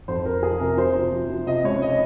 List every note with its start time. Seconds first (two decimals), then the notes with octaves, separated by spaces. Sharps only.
0.08 F2 C5
0.25 F2 A#4
0.42 F3 G#4
0.60 C3 A#4
0.77 F3 C5
0.95 F3
1.12 F3
1.30 F3
1.47 C3 D#5
1.64 C#2 C#5
1.82 D#5